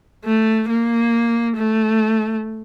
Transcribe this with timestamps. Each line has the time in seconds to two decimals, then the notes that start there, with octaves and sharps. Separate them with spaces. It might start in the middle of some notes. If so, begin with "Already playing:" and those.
0.25 A3
0.69 A#3
1.56 A3